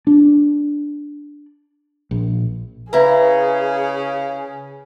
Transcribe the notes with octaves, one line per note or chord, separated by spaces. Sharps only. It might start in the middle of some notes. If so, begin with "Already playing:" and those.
D4
A#1
C#3 E4 G#4 B4 F5 A#5